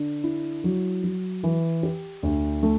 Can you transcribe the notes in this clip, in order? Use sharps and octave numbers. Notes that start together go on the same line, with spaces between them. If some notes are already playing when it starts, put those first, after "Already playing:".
Already playing: D3
E4
F#3
F#3
E3
G4
D2
A3